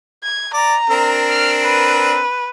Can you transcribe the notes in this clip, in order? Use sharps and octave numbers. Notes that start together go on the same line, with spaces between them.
G#6
D5 A#5
C4 D4 A#4
F6
B4